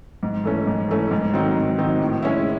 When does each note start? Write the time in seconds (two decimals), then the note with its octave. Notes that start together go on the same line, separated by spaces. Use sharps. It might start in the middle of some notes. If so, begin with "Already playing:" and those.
0.23 G#2
0.44 E3 A3 C#4
0.67 G#2
0.89 E3 A3 C#4
1.11 G#2
1.33 D#3 F#3 C4 D#4
1.56 G#2
1.78 D#3 F#3 C4 D#4
2.00 A2
2.22 G#3 C#4 E4